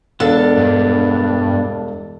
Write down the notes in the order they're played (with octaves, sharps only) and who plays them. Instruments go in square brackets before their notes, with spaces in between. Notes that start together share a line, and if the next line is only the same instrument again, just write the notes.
[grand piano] E1 F5 [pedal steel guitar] B3 D4 [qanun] A4
[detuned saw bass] G2